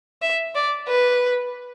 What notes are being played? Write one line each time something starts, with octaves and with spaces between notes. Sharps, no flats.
E5
D5
B4